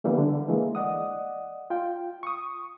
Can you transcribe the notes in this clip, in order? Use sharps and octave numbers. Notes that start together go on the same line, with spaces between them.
D3 E3 G3 A#3 B3
D3
E3 G#3 A#3
D5 D#5 F#5 D#6
F4 G5
C#6 D#6